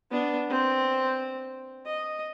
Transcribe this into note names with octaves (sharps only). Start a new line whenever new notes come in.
B3 D4
C4
D#5